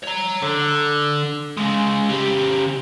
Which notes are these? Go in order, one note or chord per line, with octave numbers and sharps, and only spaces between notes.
C#5 A#5
D3
C#3 G#3
C#3 G4